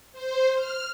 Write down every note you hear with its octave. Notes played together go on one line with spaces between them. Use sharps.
C5
F6